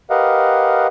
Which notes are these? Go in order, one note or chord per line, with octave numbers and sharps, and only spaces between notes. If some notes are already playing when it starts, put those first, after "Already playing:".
G4 A#4 B4 D#5 F5 F#5